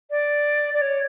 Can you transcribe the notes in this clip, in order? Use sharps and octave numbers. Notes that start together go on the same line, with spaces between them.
D5
D5
C#5